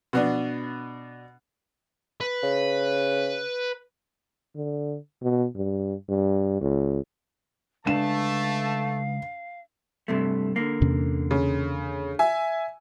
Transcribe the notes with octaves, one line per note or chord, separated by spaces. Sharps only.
B2 B3 D4
B4
C#3
D3
B2
G2
G2
C#2
C#3 G#3 A3 D4 B4 F5 A5 E7
G2 C3 A3
D3 A#3
E2 C3 C#4
C#3
E5 G#5